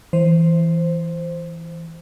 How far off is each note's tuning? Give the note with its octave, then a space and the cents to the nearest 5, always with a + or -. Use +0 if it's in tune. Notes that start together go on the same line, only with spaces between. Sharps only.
E3 +5 C5 +0